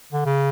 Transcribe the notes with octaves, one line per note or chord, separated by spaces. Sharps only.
D3
C#3